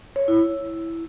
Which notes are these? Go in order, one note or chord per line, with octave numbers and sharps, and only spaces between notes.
C#5
E4